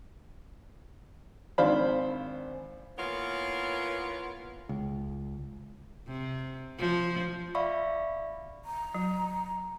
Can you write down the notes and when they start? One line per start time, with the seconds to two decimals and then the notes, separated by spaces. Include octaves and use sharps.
1.58 G#1 D4 C5 F5 B5
2.98 E3 A#3 B3 F4 A#4 C#5
4.69 C#2
6.07 C3
6.78 F3
7.55 D5 E5 F5 B5 C#6
8.65 A#5
8.94 F#3